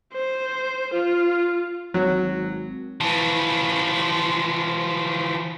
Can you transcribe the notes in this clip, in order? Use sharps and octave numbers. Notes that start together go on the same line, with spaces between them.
C5
F4
G#1 F#3
E3 F3